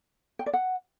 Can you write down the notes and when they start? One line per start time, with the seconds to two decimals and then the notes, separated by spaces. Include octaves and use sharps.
0.39 G5
0.46 D5
0.53 F#5